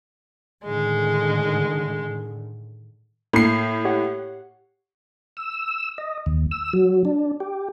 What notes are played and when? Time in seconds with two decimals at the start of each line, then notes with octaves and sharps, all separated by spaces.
0.64 A2 D3 D#3 G#3
3.33 A2 A#3 C7
3.85 G4 C#5 F#5
5.37 E6
5.98 D#5
6.26 D#2
6.51 E6
6.73 F#3
7.05 D4
7.40 G4